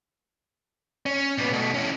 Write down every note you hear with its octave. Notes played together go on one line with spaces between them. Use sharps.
C#4
A#2 B3
B2 A3
C#4 E4